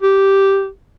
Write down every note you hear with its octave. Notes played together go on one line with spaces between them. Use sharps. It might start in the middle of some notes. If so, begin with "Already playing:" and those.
G4